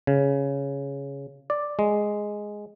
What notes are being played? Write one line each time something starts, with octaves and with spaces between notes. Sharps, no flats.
C#3
D5
G#3